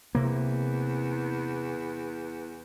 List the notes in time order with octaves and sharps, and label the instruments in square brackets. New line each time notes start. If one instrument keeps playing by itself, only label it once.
[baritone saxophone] E2 [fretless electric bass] C3 A#3